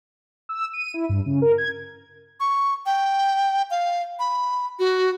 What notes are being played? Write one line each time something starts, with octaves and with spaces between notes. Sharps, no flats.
E6
D#7
E4
G2
C#3
A#4
G#6
C#6
G5
F5
B5
F#4